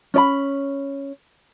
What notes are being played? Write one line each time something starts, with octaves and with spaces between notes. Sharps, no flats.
C#4 D5 B5